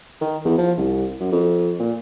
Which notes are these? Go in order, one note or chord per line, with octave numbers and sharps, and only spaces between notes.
D#3
E2
F3
C2
F#2
F2
A#2